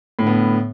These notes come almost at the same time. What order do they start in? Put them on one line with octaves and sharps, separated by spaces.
A2 D3 B3